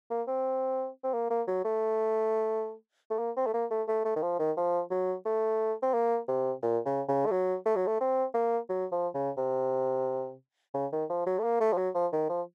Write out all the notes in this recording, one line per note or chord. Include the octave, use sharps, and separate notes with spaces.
A#3
C4
C4
A#3
A#3
F#3
A3
A3
A#3
C4
A3
A#3
A3
A3
A3
D#3
F3
D#3
F3
F#3
A3
C4
A#3
C3
A#2
C#3
C#3
A3
F#3
A3
F#3
A3
C4
A#3
F#3
F3
C#3
C3
C#3
D#3
F3
F#3
A3
A#3
A3
F3
F#3
F3
D#3
F3